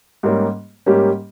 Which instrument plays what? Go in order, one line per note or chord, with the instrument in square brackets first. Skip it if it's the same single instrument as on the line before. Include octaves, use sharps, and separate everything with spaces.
[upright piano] G#2 G3 A#3 C#4 G4
G#2 G3 A#3 C#4 G4